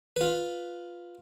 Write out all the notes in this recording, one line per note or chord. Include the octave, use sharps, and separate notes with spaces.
F4 B4